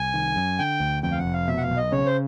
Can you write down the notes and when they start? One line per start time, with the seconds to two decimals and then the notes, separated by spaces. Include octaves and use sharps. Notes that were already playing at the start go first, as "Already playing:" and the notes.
Already playing: C2 G#5
0.14 D#3
0.36 F#2
0.59 D3 G5
0.80 D2
1.03 F2 G5
1.12 F5
1.18 F#5
1.25 F1
1.33 F5
1.48 B2 E5
1.58 F#5
1.63 F5
1.70 B1
1.77 D#5
1.92 C#3 C#5
2.06 C5